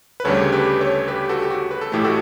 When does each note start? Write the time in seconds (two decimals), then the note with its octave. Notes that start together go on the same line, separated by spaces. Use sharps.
0.20 B4
0.25 D2 C#3 G3 D4 A4 C#5
0.52 G4 B4
0.81 A4 C#5
1.08 G4 B4
1.29 F#4 A4
1.42 G4
1.50 F#4
1.71 B4
1.81 A4
1.92 A1 A2 E3 A3 G4
2.04 F#4 A4